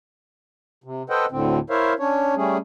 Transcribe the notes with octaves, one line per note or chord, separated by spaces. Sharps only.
C3
A4 B4 C5 D#5 F#5 G5
D2 A2 D3 C4
E4 A#4 C5 C#5 E5 F5
C#4 D4 C#5
G3 A3 C#4 G#4